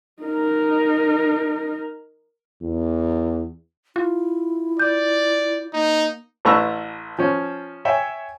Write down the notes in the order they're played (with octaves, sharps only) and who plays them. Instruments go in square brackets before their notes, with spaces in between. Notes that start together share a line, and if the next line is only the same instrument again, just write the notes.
[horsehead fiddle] D#4 A#4
[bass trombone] E2
[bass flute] E4 [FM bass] F4
[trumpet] D5 [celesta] G6
[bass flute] A#3 [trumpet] D#4
[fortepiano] A1 A3 B4 A#5 C#6 E6
F3 C#4
C#5 E5 G5 G#5